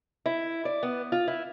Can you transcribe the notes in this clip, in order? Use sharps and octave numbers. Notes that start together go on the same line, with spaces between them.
E4
D5
B3
F4
E4